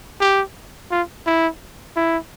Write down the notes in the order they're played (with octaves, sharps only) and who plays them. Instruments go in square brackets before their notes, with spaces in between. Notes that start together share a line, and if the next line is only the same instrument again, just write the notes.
[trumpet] G4
F4
E4
E4